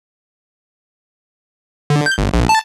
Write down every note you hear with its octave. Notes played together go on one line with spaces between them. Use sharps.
D3
G6
G1
A#1
A5